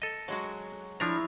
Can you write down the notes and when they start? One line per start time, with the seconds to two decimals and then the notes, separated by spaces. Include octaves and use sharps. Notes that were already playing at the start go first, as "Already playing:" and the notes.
0.02 A4 D#5
0.28 F#3 G#3 F#4
1.00 F3 D4 E4 C#5 A#5